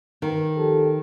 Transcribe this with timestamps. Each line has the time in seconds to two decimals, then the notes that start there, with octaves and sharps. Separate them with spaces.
0.22 D#3
0.56 F3 G4 A4